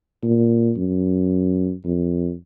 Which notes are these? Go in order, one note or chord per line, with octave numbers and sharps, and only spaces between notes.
A#2
F#2
F2